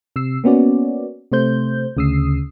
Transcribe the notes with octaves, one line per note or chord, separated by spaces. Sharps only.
C3 E6 C7
A#3 B3 C#4 F#4 D5
C3 A3 C5 G6
D2 C#3 D#6 E6 C7